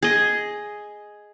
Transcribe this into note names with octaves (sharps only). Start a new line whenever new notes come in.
G#4 D#5